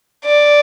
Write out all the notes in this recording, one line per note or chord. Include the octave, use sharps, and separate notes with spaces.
D5